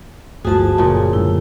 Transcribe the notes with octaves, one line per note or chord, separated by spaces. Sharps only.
D1 G1 F3 A3 F#4 G#4 A5
F#1 A#2 C#3
F#2 A2 D3 E4